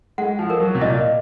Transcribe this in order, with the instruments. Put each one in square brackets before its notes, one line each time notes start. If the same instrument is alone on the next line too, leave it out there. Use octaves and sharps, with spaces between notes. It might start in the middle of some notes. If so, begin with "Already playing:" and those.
[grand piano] G#3 [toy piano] F#5
[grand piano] F3
[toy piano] A#4
[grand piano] F#3
C3
[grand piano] A#2 [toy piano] D#5